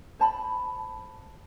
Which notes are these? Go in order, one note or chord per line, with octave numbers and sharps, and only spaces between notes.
C5 A5 B5